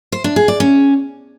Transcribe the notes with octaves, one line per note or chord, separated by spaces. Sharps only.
C5
D4
G#4
D5
C#4